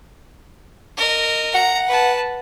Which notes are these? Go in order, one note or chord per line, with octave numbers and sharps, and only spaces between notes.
A#4 D#5
F#5 A#5
B4 A5